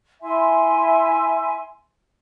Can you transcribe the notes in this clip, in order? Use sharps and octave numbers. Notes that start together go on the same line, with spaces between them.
E4 E5 G#5 C6